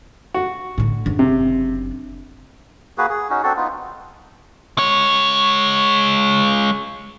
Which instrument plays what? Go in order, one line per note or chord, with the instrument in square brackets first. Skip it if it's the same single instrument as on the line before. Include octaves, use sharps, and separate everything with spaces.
[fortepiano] F#4
[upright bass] A2 D3
F#1 D4
[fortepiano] C3
[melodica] A#3 F#4 G#4 B4
G#4
C#4 D#4 F#4
C4 D4 F#4 A4
B3 D#4 F4
[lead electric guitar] G#3 C#5